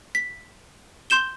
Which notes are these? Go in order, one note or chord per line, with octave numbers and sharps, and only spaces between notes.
B6
C6 G6 E7 G7